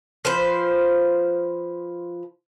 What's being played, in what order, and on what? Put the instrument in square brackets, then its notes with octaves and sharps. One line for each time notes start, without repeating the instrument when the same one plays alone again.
[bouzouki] F3 B4 C5